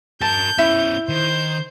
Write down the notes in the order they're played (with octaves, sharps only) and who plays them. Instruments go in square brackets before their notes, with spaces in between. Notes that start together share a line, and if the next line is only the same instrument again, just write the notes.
[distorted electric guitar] F#4 A#4 [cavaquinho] A5 [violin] G6
[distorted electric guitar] B3 C#4 [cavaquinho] E4
[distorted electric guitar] D#3 [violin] C5 G6